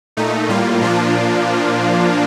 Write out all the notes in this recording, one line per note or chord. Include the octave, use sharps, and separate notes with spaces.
A#2 A3 D#4
A2 G3 A#3 F4
A#2 F3 A#3 D4 F4